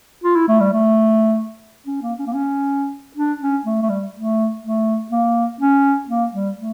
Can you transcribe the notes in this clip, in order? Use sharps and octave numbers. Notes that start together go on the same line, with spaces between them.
F4
E4
A3
G3
A3
C#4
A#3
C#4
A#3
C#4
D4
C#4
A3
A3
G3
A3
A3
A#3
C#4
A#3
G3
A3